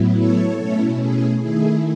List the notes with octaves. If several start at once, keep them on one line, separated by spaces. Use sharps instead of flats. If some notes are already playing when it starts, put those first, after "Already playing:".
Already playing: A2 F#3 B3 E4
A4 C#5
B2 A3 C#4 E4
G#4
D#3 A3 E4 G#4